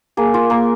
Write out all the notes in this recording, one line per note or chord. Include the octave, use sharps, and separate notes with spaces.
A#3 G#4
F4
A#3